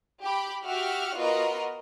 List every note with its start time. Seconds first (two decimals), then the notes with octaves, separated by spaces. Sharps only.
0.22 G4 B5
0.64 F#4 G4 E5 F#5 F6
1.15 B3 F4 F#4 A#4 D#5